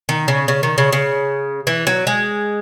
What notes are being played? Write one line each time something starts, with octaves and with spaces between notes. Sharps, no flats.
D#3
C#3
C#3
D#3
C#3
C#3
E3
F#3
G#3